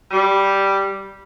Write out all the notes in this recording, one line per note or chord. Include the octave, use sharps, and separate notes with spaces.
G3